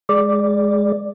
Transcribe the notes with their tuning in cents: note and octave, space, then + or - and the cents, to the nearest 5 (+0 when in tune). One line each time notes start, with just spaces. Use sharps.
G#3 +0 D5 +0